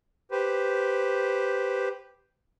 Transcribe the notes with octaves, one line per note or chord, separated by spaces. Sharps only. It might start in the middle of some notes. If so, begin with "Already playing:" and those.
G4 B4 C5